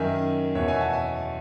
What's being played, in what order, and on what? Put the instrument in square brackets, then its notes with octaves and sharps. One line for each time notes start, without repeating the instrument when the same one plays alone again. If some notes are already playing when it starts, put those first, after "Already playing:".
Already playing: [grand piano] F#2 D#3 E5 G#5
E2 B2 C#5 E5
E5 G#5
F#5 A5
E5 G#5